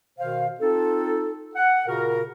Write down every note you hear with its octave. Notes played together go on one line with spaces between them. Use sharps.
B2 D#3 C5 F5
C4 D#4 F4 A4
F#5
A#2 C#3 F#4 A#4